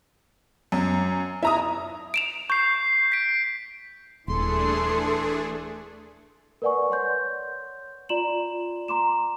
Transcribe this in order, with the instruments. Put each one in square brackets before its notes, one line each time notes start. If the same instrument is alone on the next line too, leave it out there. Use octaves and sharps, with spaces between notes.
[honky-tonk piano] F#2
E4 A#5 D#6
[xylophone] D7 E7 F7
[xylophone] C#6 [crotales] G6 C7
[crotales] B6 D7
[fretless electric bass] D#1 [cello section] E3 A4 [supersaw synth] A3 D4 G#4 [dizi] C6
[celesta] A#4 B4 D5 F#5 G#5 C#6
C#5 F#5 C6 G6
F4 D5 A#5 C6 E7 F#7
A#5 C6 D6 E7